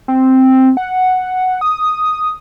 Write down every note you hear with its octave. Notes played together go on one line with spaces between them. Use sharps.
C4
F#5
D#6